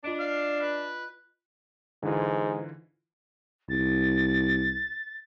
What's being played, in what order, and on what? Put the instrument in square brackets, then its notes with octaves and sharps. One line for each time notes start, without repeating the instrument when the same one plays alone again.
[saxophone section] D4 [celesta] F4 D#5 D7
[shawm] F5
B4
[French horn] G#2 [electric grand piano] D3 E3 F4
[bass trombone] C2 [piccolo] A6